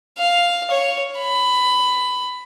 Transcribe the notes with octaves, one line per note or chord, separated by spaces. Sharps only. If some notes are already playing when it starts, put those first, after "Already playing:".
F5
C#5
B5